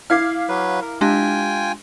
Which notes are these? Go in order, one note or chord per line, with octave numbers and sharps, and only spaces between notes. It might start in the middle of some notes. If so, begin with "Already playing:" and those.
E4 F5 D6 F6 G#6 C7
F#3 B4
A#4
G#3 D4 F4 G4 G5 G#5